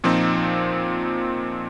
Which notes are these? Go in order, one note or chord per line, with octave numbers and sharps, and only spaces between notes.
A#2 F3 C4 D#4